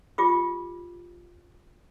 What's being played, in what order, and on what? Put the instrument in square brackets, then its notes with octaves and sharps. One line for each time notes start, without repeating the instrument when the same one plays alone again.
[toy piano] F4 G4 D6